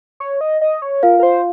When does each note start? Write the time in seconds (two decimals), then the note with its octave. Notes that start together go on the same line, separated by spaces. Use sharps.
0.20 C#5
0.41 D#5
0.61 D#5
0.82 C#5
1.03 F4 A#4 F5
1.19 A#4
1.23 C5